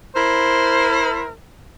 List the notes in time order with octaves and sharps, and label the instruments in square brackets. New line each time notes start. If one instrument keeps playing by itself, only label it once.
[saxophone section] E4 A#4 C5